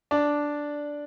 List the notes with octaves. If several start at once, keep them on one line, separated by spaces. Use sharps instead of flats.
D4 D5